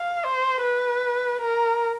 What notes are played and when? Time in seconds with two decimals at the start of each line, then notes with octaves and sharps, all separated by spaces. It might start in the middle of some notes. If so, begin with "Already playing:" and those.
Already playing: F5
0.25 C5
0.63 B4
1.41 A#4